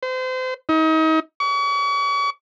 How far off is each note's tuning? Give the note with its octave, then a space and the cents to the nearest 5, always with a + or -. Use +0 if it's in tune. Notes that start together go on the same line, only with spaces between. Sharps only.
C5 -30
D#4 +35
C#6 +40